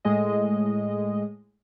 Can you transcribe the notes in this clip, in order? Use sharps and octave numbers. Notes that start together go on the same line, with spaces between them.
A2 G#3 D#5